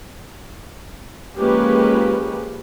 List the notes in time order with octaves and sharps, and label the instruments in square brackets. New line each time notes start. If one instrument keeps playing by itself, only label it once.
[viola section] F3 G#3 A#3 C#4 G4 B4